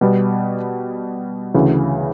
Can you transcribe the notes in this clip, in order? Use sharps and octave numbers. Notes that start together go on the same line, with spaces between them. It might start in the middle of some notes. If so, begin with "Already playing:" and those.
B2 G3 B3
D2 C#3 E3